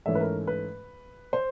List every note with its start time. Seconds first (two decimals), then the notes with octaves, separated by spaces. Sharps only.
0.06 G#2 E3 A3 C#4 E5
0.15 B4
0.20 A#4
0.47 B4
1.33 C5